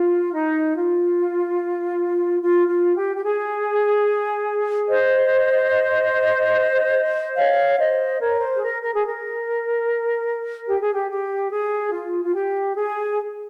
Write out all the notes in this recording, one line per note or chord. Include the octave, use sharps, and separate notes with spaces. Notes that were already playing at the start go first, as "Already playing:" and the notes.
Already playing: F4
D#4
F4
F4
F4
G4
G4
G#4
C5 D#5
C#5 F5
C5 D#5
A#4 C#5
C5
G#4
A#4
A#4
G#4
A#4
G4
G#4
G4
G4
G#4
F4
F4
G4
G#4